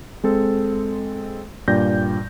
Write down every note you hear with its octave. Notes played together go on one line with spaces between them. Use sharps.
G#3 C4 A4
G2 A#2 D5 G5 G6 A#6